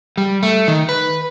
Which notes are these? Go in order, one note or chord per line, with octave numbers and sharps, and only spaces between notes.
G3
A3
D#3
B4